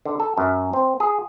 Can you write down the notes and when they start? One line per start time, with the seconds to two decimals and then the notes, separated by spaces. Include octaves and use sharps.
0.05 D3
0.20 A4
0.37 F#2
0.73 C4
1.00 G#4